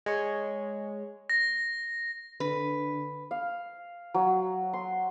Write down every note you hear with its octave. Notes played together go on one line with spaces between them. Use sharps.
G#3 C#5
A#6
D3 B4
F5
F#3
C6